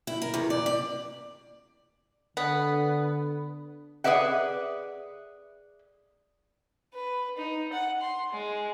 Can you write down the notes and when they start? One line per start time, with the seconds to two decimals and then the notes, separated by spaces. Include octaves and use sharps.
0.07 E4
0.22 A#4
0.34 E2
0.50 D5
0.66 D5
2.37 D3 B3
4.04 G#4 B4 D5 E5 F#5
6.94 B4
7.38 D#4
7.73 F#5
8.01 C6
8.31 G#3